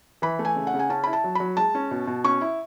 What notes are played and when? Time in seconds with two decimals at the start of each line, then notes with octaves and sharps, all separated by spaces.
0.22 E3 B5
0.39 A3
0.45 G#5
0.56 C#3
0.67 F#5
0.74 C#3
0.79 G#5
0.89 C#4 A5
1.04 E4 B5
1.13 A5
1.24 F#3
1.35 F#3 B5
1.57 G#3 A5
1.75 C#4
1.91 B2
2.07 B2
2.24 C#4 C#6
2.41 E4